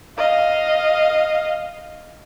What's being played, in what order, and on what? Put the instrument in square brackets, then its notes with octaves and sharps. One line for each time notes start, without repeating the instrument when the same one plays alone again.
[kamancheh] D#5 F5